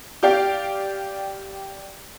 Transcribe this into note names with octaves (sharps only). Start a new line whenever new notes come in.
G4 D5 F5 G5